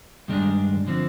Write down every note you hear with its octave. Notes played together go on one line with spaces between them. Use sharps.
G2 D#3 G#3 D4 G#4
D3 F3 C4